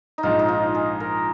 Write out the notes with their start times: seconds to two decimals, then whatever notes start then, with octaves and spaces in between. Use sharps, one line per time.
0.18 D#4
0.23 A#1 G#2 F3 F4
0.39 D#4
0.48 F4
0.75 G#4
1.00 A#4